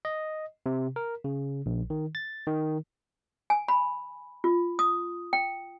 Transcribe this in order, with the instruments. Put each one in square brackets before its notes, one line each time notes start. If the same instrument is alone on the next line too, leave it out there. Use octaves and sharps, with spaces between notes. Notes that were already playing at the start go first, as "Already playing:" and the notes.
[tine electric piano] D#5
C3
A#4
C#3
A#1
D#3
A6
D#3
[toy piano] G#5
B5
F4
D#6
G5